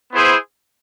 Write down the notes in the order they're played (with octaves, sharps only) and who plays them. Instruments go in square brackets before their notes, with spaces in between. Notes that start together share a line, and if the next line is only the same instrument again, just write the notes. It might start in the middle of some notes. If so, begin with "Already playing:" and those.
[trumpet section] B3 E4 G#4 C5